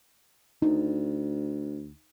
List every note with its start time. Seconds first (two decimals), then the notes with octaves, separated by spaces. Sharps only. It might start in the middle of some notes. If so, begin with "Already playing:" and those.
0.62 D2 D#4